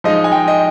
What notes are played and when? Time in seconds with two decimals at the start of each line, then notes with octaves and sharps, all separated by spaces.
0.04 F3 G#3 D#4 D#5
0.24 G#5
0.32 G5
0.48 D#5